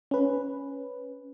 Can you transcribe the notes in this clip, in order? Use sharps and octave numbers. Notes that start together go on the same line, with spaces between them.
C#4 B4